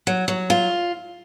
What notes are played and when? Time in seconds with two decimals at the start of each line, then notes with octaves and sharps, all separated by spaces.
0.07 F#3
0.28 F#3
0.50 F4